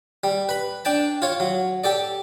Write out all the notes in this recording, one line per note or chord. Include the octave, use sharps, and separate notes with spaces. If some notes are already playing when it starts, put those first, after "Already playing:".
G3
B4 B5
D4 G5 A5
F4 C#5
F#3
G4 A4 D5